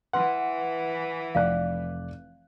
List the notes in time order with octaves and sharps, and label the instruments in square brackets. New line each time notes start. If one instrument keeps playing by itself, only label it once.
[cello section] E3 [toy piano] B4 C6 [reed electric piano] F#5
[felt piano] F1 D5 F#6 [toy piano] F5